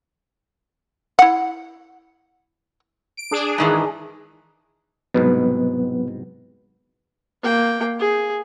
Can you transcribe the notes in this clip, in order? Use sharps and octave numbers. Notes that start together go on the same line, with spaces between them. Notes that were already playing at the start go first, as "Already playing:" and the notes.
E4 F#5
D7
D4 G#4
G#2 D#3 E3
C2 G#2 B2 F#3 B3 B4
A#3 G5
G#4